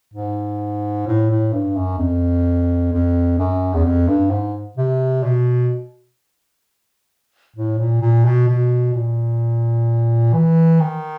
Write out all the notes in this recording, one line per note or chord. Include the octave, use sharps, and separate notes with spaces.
G#2
A2
A2
G2
F#2
F2
F2
F#2
E2
F2
G2
G#2
C3
B2
A2
A#2
A#2
B2
B2
A#2
E3
D#3